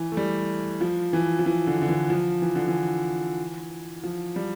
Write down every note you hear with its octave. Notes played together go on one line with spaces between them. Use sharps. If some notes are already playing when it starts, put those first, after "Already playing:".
Already playing: E3
A3
G3
F3
E3
F3
E3
D3
D3
E3
F3
E3
D3
E3
F3
G3